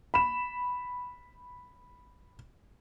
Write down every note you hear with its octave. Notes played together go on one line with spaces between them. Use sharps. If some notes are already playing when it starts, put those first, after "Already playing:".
B5 E7